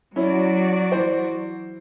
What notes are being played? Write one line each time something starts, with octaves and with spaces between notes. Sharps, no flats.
F#3 C#4 E4 F#4 D5
E3 C5